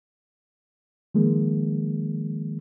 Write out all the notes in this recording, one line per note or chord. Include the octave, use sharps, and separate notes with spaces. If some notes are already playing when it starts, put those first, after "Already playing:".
D#3 F3 G#3 A#3